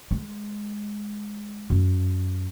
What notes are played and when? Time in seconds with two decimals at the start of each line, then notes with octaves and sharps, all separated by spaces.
0.11 G#3
1.70 F#2